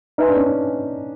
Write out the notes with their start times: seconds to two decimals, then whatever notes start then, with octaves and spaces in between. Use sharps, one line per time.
0.18 D#4 B4 E5 G#5 C6
0.28 D4
0.37 C#4
0.46 D4